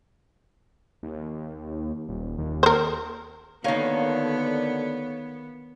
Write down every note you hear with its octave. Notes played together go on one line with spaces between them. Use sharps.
D#2
D#1
D#2
A#4 C5
D2 D3 D#3 A#3 B3 C#5 F5